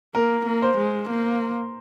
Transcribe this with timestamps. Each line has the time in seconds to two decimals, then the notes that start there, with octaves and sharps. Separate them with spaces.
0.15 A#3 A#4
0.46 A#3
0.62 C5
0.78 G#3
1.10 A#3